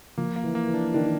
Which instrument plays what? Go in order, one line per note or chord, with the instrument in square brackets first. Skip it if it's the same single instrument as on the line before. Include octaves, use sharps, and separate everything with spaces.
[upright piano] F3 [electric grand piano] A#3
[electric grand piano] A#3
[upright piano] E3
[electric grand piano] A#3
[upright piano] E3
[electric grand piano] D4
[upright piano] D#3 [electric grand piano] D4